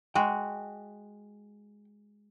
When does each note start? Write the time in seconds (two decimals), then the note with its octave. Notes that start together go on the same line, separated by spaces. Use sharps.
0.15 G#3 F#4 G5